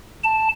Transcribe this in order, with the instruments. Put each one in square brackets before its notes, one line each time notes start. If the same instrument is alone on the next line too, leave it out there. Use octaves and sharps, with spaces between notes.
[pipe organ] A5